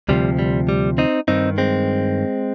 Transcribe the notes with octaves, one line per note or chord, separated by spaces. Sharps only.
D2 C3 F3 G3
G3
G3
C4 D#4
G2 D#3 C4 D#4
G#3 C4